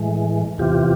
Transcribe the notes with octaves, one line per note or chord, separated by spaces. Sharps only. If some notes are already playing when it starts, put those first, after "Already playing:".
Already playing: A2 E3 G#3
E2 C3 E3 F4 G4